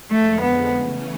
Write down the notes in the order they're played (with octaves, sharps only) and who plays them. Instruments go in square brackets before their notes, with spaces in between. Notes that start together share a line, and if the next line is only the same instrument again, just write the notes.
[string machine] F2 D3 F3 G#3 [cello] A3
[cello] B3
[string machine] C#3 E3 A3 C#4